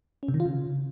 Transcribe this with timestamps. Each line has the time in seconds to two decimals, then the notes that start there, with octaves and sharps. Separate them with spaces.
0.23 C#4
0.28 C3
0.34 D#3
0.40 F4
0.46 C#3